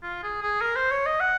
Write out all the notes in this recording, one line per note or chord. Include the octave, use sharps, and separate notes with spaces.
F4
G#4
G#4
A#4
C5
C#5
D#5
F#5